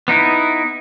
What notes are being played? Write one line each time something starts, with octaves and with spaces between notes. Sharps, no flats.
B3 D#4 E4